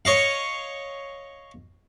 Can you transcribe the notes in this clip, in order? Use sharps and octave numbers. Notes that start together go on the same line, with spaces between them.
C#5 D#5 F5